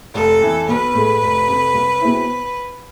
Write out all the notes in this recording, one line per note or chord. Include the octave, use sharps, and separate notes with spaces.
F1 A4
F2 E3
B1 B4
A2 G#3
F1
F2 C3
C2
B2 G#3 C4 E4